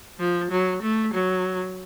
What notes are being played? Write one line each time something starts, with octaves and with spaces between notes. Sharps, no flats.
F3
F#3
A3
F#3